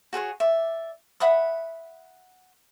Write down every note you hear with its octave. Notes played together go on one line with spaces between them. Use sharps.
F#4 G#4 B4 C#5
D5 E5
E5 F#5 B5 D#6